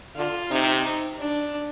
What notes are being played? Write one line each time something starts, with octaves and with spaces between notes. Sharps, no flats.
D3 F4
C3 D#4
D4